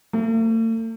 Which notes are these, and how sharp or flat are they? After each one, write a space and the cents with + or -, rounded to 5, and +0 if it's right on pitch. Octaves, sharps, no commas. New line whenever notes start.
A3 +45